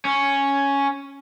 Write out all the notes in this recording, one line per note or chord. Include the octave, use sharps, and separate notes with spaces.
C#4